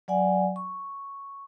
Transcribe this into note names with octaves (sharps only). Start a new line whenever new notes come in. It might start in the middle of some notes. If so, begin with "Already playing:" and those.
F#3 D5 F#5 G#5
C#6